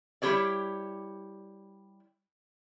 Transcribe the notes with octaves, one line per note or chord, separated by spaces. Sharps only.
G3 E4 F4 G4 C#5 D5